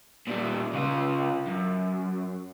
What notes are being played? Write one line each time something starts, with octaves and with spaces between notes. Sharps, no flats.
A#2 G3
C#3 F4
F#2